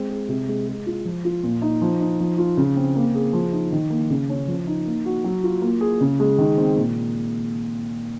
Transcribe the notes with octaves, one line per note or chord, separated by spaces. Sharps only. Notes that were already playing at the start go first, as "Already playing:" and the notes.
Already playing: G#3 C4
G#4
C3
G#3
G#3
F4
F3
F4
A#2
D#4
F3
D#4
F3
F4
C#3
C4
A#3
G#4
F3
D#4
D#3
A#3
C#3
C#4
F3
D#4
A#3
F#4
F#3
F4
A#3
G#4
C#3
G#3
D#3
C4
A#2